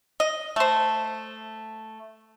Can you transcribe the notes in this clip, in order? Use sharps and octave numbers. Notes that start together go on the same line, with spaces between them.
D#5
A3 C5